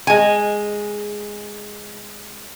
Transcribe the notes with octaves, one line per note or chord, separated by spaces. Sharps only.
G#3 G#5